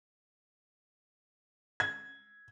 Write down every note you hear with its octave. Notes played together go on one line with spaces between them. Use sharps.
G#6